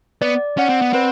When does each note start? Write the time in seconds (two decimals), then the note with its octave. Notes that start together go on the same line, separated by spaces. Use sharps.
0.22 B3 D5
0.58 C#4 F#5
0.69 C4
0.81 B3
0.93 C4 B4